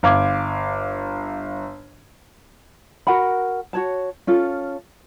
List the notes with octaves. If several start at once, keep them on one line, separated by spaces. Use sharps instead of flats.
G1 F5 D6 G#6
F#4 A#4 F#5 B5
F#4 C#5 A5
C#4 F4 A4